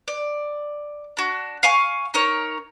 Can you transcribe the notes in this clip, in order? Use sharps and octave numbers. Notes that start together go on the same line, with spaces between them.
D5
D4 F#4
F5 G#5 C#6
D#4 A#4 C#5